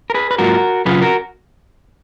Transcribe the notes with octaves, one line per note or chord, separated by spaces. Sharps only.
A#4
G#4 B4
B4
G#2 F#3 A#3 F4 F#4 A#4
F#2 C#3 F#3 C#4 F4 G#4 B4
F#4 A#4